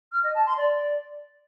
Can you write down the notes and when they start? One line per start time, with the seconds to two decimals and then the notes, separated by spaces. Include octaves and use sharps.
0.12 F6
0.23 D#5
0.35 A5
0.46 C6
0.57 D5